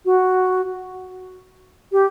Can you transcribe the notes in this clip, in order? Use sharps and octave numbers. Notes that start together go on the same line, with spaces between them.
F#4
G4